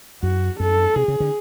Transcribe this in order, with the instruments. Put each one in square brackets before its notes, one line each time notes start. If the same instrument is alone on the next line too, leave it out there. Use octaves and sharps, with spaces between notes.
[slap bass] F#2 [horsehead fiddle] F#4
[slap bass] F#2 [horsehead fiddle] A4
[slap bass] C3 [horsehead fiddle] G#4
[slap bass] C#3
D3